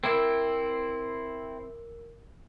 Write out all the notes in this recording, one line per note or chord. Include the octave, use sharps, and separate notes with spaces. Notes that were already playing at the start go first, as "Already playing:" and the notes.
C4 E4 A#4 D6 E6